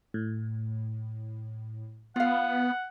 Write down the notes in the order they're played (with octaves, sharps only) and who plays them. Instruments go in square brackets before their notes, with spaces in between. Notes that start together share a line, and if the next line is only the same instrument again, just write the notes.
[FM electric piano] A2
[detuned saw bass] B3 [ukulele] F4 F5 [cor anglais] F#5